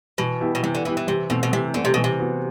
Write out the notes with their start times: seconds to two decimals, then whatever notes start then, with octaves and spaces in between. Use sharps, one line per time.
0.18 B2 E3
0.41 B3 E4 G4
0.55 B2
0.63 C3 E3
0.75 D3
0.85 E3 B3 E4 G4
0.97 E3
1.07 C3 E3
1.30 B2 A3 C4
1.43 B2
1.52 C3 E3
1.74 D3 A3 C4
1.85 C3
1.94 B2 E3
2.04 C3
2.19 B3 F#4